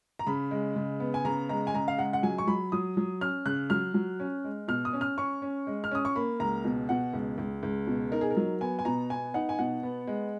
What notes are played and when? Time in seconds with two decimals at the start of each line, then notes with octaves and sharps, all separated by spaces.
0.19 A#5
0.27 C#3 B5
0.51 G#3
0.76 C#3
1.00 B3
1.14 G#5
1.25 C#3 A#5
1.49 G#3 A#5
1.67 G#5
1.74 C#3 A#5
1.88 F5
1.98 G#3 F#5
2.13 F#5
2.23 F#3 G#5
2.38 C#6
2.47 F#3 B5
2.72 F#3 D#6
2.97 F#3
3.21 C#4 F6
3.46 C#3 F#6
3.70 F#3 F6
3.94 F#3
4.20 C#4
4.44 G#3
4.68 B2 F6
4.85 D#6
4.93 C#4
5.01 F6
5.18 C#4 C#6
5.42 C#4
5.67 G#3
5.84 F6
5.91 C#4 D#6
6.05 C#6
6.16 A#3 B5
6.40 C#2 A#5
6.64 B2
6.89 B2 F#5
7.14 C#2
7.38 C#2
7.63 C#2
7.87 B2
8.12 D#4 A#4
8.21 G#4
8.31 A#4
8.37 F#3
8.61 B3 G#5
8.79 G#5
8.85 B2 A#5
9.10 B3 G#5
9.34 D#4 F#5
9.49 G#5
9.59 B2 F#5
9.83 B3
10.07 G#3